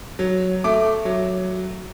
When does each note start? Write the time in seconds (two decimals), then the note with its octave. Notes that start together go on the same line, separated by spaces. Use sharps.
0.19 F#3
0.64 A3 D6
1.05 F#3